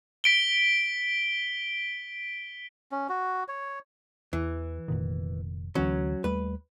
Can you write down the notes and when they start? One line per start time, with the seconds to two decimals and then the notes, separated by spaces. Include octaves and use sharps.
0.24 B6 D7 G7
2.91 C#4
3.09 F#4
3.48 C#5
4.33 E2 E3
4.88 F1 A#2 D#3
5.75 D2 E3 F#3 C#4
6.24 D#2 G3 A3 B4